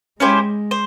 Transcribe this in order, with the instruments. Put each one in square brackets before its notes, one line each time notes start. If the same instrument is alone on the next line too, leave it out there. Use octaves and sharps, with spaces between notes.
[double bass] G#3 [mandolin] C#4 E4 G4 C5
[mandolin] C5